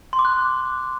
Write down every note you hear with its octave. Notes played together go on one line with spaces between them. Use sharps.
C6
D6
F#6